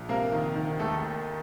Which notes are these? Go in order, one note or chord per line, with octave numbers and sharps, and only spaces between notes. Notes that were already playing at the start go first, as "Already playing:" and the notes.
Already playing: A#1
C3 A#3 A#4
D#3
D#3
D#2 A3 A4